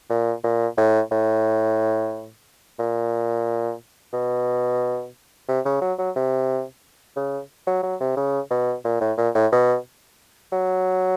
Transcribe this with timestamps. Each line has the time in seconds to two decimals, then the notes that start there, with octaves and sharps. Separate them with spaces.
0.10 A#2
0.44 A#2
0.77 A2
1.11 A2
2.79 A#2
4.13 B2
5.48 C3
5.65 C#3
5.82 F#3
5.98 F#3
6.16 C3
7.16 C#3
7.67 F#3
7.83 F#3
8.00 C3
8.17 C#3
8.51 B2
8.85 A#2
9.01 A2
9.18 A#2
9.35 A2
9.52 B2
10.52 F#3